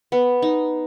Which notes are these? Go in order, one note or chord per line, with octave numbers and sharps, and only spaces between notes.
B3
D#4